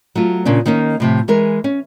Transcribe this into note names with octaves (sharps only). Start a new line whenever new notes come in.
F#3 A3 F4
A#2 C#3 C#4 D4
D#3 A#3 C#4 D#4
A2 C3 F3
E3 G#3 A#4
C#4